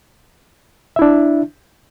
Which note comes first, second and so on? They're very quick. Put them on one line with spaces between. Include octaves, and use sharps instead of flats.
E5 E4 D4